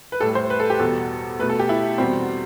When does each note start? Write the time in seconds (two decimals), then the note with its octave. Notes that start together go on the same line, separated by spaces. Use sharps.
0.12 B4
0.20 A2 G3 A4
0.35 C5
0.50 B4
0.60 A4
0.70 G4
0.79 E2 B2 G3 A4
1.39 A3 B4
1.43 B2
1.49 A4
1.59 G4
1.69 E4
1.98 E2 B2 G3 C4